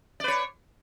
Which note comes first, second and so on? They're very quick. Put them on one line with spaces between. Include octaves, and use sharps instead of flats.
D5 B4 C#5